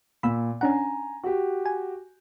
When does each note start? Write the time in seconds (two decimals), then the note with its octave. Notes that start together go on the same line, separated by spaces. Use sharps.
0.23 A#2 B5 E6
0.61 C#4 D4 F#5 G#5 A#5
1.23 F#4 G4
1.66 G#5